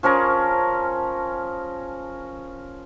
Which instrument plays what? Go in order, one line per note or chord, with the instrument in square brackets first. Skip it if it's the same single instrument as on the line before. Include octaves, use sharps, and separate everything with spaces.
[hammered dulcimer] F3 C#4 G#4 A#4